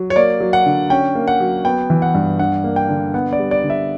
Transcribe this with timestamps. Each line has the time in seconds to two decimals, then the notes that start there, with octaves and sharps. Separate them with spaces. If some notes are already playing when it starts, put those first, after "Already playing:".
Already playing: F#3
0.10 C#5
0.16 A#3 D5
0.41 F#3
0.53 F#5
0.66 D3
0.90 C#4 G5
1.15 A#3
1.28 F#5
1.40 F#3
1.65 B3 G5
1.90 E3
2.02 F#5
2.15 G2
2.39 D4 F#5
2.64 A#3
2.76 G5
2.89 D3
3.14 B3 F#5
3.33 D5
3.39 G3
3.51 D5
3.64 D3
3.70 E5